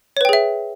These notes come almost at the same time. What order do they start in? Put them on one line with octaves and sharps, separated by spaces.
C#5 B4 G5 G#4 E5